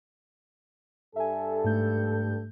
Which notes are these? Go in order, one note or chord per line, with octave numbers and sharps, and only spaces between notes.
G2 A4 E5 G#5
G#2 A3 G6